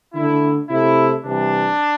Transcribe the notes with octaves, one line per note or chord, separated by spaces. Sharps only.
D3 A3 E4
C3 A3 E4
C3 E3 G3 D4